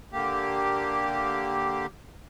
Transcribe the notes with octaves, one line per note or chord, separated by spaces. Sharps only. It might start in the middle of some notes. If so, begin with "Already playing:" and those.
D3 A#3 G4